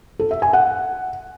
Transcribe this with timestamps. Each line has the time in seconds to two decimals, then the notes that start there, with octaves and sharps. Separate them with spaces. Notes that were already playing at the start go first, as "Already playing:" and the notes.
0.19 A4
0.31 E5
0.42 G#5
0.53 F#5